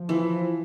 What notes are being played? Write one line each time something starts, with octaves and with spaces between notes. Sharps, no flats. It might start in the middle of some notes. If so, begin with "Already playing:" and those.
Already playing: F3
E3